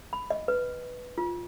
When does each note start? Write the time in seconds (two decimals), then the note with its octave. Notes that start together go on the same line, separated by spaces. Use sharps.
0.13 B5
0.30 D#5
0.48 B4
1.18 F4